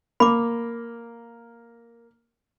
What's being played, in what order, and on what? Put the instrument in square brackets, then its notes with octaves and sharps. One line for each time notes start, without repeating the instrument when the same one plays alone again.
[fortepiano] A#3 [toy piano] B5 D6